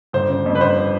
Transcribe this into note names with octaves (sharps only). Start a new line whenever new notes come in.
G1 C5
C#3
F2
B4
G1 C5